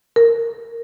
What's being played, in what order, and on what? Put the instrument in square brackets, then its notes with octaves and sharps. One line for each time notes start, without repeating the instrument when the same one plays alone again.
[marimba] A#4